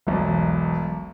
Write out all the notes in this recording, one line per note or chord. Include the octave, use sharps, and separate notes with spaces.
E1 B1